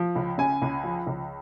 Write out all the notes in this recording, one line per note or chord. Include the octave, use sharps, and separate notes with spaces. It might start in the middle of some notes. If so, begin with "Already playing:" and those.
Already playing: F3
C#2
C#3 G#5
C#2
F3
C#2